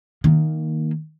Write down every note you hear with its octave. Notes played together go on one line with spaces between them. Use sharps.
D#3 A#3